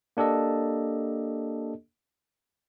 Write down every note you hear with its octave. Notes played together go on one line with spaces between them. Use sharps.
A#3 D4 G4 A4 D#5